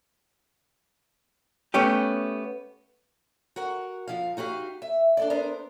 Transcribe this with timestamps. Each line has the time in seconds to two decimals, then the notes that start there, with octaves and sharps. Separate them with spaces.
1.74 A3 B3 C#4 G4
3.56 F#4 A#4 F#5
4.08 F2 F3 F5
4.37 D#4 F#4 G4 C5 F5
4.82 E5
5.17 D4 A4 D5
5.30 B3 D4 A#4 C5